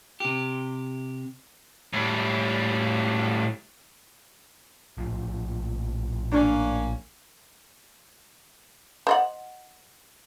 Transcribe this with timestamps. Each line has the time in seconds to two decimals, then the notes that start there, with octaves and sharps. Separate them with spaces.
0.20 C3 G4
1.93 A2 G3
4.97 A#1 A2 F3
6.32 A#3 C#4 D4
9.07 C5 D#5 F#5